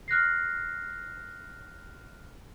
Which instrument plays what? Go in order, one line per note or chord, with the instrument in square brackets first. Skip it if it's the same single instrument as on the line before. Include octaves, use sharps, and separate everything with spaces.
[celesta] F6 F#6 A#6 C7